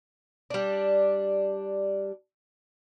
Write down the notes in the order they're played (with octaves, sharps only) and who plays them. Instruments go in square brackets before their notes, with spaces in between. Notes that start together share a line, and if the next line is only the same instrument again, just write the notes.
[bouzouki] G3 D4